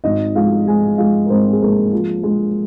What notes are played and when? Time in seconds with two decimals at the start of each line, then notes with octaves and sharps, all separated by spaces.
0.04 G#1 D#4 D#5
0.35 G#3 F4 F5
0.67 G#2 G#4 G#5
0.98 G#3 F4 F5
1.26 A#4
1.29 G#2 C4 C5
1.52 G#4
1.61 G#3 A#3 A#4
1.92 F3
2.23 G#3